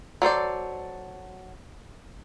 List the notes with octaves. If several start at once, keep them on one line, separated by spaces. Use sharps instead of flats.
F#3 A4 C5 D5